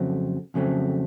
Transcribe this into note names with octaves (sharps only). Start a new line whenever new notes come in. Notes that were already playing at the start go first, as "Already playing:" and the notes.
Already playing: F2 C#3 F#3 A3 C4
F2 C#3 F#3 A3 C4